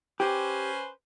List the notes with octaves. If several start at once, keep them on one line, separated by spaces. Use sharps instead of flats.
C#4 G4 B4 C5